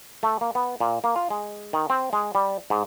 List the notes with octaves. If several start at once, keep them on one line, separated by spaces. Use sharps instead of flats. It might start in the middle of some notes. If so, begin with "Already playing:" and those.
A3
A#3
B3
A#2
A#3
F4
G#3
D#3
C4
G#3
G3
G#2